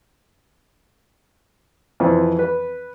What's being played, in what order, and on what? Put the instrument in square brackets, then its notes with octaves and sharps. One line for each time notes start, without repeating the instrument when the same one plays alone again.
[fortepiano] F2 E3 C4
B4